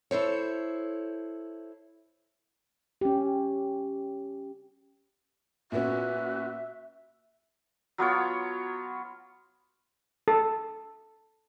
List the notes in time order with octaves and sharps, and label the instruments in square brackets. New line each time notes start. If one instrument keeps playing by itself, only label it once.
[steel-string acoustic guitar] E4 A4 C5 C#5
[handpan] C#4 G4
[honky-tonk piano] A#2 B3 C#4 [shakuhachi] F#4 [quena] E5
[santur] F#3 B3 F4 C#5
[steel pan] A4